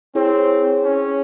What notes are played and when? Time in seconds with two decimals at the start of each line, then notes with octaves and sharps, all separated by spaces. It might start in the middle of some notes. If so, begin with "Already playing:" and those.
0.15 C4 E4 G#4 C#5
0.83 C#4